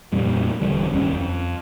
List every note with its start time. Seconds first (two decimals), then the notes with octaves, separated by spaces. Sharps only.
0.12 F2 A#2 G3
0.61 E1 E2 D3 G3
0.93 F#1 D#2 G3 C#4
1.12 F2